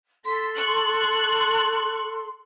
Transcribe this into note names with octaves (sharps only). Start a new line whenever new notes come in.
A4 C6 B6
C#6 F#6